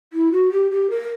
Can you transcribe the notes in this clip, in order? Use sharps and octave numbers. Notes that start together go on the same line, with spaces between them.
E4
F#4
G4
G4
A#4